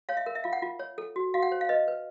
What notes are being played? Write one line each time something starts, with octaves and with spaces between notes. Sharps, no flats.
C#5 F5
E5
A#4
E5
F4 F5
F#5
F4
C#5
A4
F#4
F#4 F5
F#5
C5
F5
B4 D#5
B4